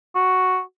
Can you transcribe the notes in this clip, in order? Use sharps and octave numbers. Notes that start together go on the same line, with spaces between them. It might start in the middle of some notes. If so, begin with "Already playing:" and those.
F#4